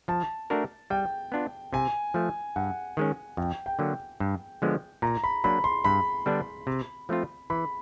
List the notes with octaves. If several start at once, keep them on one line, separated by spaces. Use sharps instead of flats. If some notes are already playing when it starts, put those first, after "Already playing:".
F3 A5
A3 D4 F#4 A#4
G3 G5
B3 D4 F4
C3 G#5
F3 A3
G2 F#5
D#3 G#3 C#4
F2 G5
G5
D3 F#3 A#3
G2
D3 F3 G#3 B3
A#2 A#5
B5
F#3 A#3 D4 B5
C6
G2 B5
D3 G3 B3 D4
C3
F3 A3 C4 F4
E3 B5